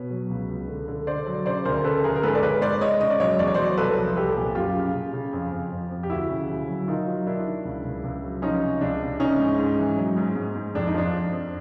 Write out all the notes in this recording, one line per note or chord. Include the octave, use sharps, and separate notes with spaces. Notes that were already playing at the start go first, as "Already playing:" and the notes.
Already playing: B2 B4 C#5
F#3
C#2
C#2
D3
D3
D3 C5 D5
F#3
C#3 C5 D5
D2 A#4 C5
C#3 A4 B4
D2 G#4 A#4
A#4
G#2 A4 B4
D5
G#2 B4 C#5
G#2 C5 D5
G#2 C#5 D#5
C#3 D#5
D5
F#3 C#5 D#5
E2 D5
C#5
F#3 C5 D5
C2 A4 B4
F3
C2 G4 A4
A#2
F#2 F4 G4
C#3
C#3
C#3
F2
F2
F2
F2
G4
D2 E4 F#4
C#3
D2
F#3
D#3 D#4 F4
F#3
D#3 D4 E4
D#3
C#2
C#2
C#2
F#3
F3 C#4 D#4
C3
C#2 D4
C3
E3 C#4 D#4
G#2
G#2
E3
F#3
G#2
G#2
G#2
F2 D4
D#4
F3 D4
F2
F2